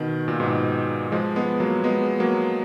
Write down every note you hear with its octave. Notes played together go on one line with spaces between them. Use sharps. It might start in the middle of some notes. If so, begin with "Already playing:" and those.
Already playing: B2 D#3
A#2
G#2 B2
F3 G#3
G#3 B3
F#3 A#3
G#3 B3
F#3 A#3